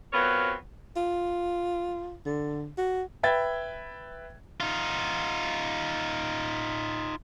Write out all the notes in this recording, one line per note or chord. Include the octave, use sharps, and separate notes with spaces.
F#3 B3 C4 F4 A#4 C#5
F4
D3
F#4
B4 E5 G5 G#6 A6
D#4 F4